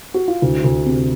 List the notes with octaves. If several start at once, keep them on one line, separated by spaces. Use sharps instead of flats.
F#4
F4
D2 E4
D2
C3